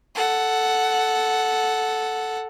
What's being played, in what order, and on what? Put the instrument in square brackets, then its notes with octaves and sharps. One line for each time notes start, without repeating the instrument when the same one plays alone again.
[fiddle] A4 F#5